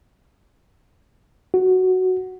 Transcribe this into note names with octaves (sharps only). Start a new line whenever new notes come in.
F#4